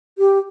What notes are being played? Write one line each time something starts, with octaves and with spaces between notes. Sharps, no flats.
G4